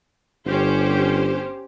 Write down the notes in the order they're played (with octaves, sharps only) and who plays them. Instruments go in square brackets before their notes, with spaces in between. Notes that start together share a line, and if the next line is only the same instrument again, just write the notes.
[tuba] G1 [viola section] C#4 G4 C5